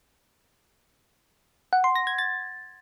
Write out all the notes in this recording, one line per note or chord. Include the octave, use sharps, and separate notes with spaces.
F#5
C6
A#6
G#6
A6